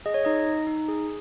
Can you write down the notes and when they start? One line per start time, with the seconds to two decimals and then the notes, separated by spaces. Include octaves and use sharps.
0.06 G#4 D#5
0.14 C#5
0.25 D#4 D#5
0.47 D#4
0.67 D#4
0.88 G#4